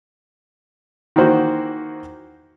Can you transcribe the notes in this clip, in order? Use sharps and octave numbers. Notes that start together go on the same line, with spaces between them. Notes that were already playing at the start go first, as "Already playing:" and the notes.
D#3 E3 A#3 F#4 C5